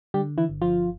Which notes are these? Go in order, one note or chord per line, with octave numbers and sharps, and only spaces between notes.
D3 G3 G4
E3 E4
G1
F3 F4